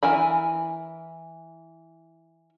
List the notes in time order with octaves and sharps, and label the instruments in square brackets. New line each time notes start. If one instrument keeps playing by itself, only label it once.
[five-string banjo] E3 A#4 G#5 B5